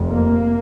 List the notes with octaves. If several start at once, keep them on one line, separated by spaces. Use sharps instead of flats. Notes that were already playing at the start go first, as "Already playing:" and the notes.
Already playing: F1 F2 C3
A#3